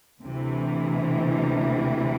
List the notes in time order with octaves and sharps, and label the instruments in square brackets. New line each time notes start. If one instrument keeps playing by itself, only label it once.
[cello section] D2 C3 E3